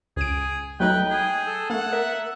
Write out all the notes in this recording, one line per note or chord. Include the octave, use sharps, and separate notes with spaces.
C#2 G#4 D7
F#3 A3 D#4 B4 G5
G#4
A4
A3 A#3 F#5
A#4 E5